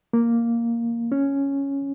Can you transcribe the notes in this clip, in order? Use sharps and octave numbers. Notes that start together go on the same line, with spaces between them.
A#3
C#4